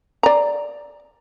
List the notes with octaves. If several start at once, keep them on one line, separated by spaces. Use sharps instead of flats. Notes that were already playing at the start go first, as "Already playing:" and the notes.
D5 A#5